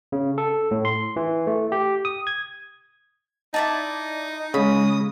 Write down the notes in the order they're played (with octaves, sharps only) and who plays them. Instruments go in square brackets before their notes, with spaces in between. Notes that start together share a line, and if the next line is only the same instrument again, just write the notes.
[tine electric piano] C#3
A4
A2
C6
E3
A3
G4
D#6
G#6
[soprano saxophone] D#4 [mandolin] E4 D5 A5
[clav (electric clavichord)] C#3 [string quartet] G#3 D#6 [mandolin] B5